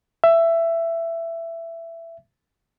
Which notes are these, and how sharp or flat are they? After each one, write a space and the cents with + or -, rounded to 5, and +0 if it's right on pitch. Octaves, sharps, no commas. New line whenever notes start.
E5 +15